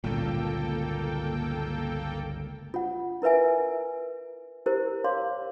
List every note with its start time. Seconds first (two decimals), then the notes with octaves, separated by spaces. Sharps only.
0.04 G1 C#2 A#2 A#3 A4 G5
2.74 F4 F#5
3.22 E4 A#4 B4 E5 G#5
4.66 E4 G4 A#4 C5
5.04 C#5 F5 C6 D6